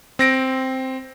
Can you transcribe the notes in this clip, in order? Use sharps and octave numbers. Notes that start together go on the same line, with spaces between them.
C4 A#6 D7